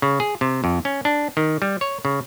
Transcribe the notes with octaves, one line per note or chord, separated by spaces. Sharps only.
C#3
G#4
C3
F2
C#4
D4
D#3
G3
C#5
C#3